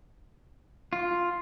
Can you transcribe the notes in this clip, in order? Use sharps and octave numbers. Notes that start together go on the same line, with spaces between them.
F4